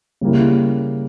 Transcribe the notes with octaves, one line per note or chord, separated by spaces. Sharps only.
C#3 G3 A#3 E4